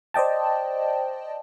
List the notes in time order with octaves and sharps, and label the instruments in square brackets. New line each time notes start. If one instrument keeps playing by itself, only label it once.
[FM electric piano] C5 D5 D#5 G5 A5